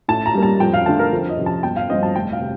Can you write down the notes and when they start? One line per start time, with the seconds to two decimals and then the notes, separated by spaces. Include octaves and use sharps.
0.08 A2 A5
0.26 A#5
0.34 G3 A#3
0.43 A5
0.60 F2 G5
0.73 F5
0.86 D3 A3 D4 F4 A5
0.99 A#4
1.12 F2
1.29 D#5
1.37 C3 F3
1.46 A5
1.63 G1 G5
1.76 F5
1.90 G2 F3 C4 D#5
2.03 A5
2.15 F1 G5
2.33 F5
2.41 C3